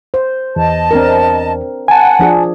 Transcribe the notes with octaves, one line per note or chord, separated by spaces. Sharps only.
C5
E2 D#5 A5
C4 D4 A#4
F#5 G#5 A5
F3 D4 G#4